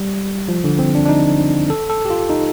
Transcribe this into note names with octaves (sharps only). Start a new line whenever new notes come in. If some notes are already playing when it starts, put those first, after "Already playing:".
Already playing: G3
F3
D3
C4
D4
D4
D#4
A4
A4
G4
F4
D#4